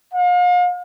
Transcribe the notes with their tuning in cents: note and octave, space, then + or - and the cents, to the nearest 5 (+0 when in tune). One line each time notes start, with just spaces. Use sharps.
F5 +40